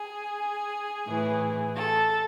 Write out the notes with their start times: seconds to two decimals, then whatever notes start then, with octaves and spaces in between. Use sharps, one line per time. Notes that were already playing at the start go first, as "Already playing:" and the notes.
Already playing: G#4
1.06 A2 E3
1.76 A4